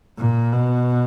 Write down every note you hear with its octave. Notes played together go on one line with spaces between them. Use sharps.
A#2
B2